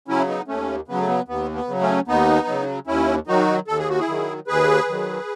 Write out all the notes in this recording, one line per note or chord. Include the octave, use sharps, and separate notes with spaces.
C#3 F#3 C#4 E4
B3 D#4
D#2 A3 C#4
C#3 F#3 B3
A3
B3
D#2 B3
B3
C#3 F#3
A3 C#4
D#2 B3 D#4
C#3 F#3
D#2 C#4 E4
D#3 F#3 D#4 F#4
D#2 A4
G#4
F#4
E4 G#4
D#3 F#3
D#2 G#4 B4
D#3 F#3